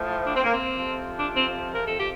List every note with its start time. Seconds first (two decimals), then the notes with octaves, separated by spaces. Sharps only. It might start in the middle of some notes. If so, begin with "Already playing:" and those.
Already playing: A2 F3
0.26 D4
0.35 C4
0.44 A#3
0.52 C4
0.73 F2 C3 F3
1.18 D4
1.34 C4
1.73 A#4
1.85 A4
1.98 G4